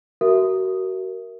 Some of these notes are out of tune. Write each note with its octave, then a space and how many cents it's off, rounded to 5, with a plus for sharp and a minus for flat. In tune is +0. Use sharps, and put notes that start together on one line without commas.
F#4 +30 A#4 +0 E5 +0